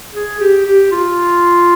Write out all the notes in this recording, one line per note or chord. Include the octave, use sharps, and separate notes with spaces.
G#4
G4
G4
F4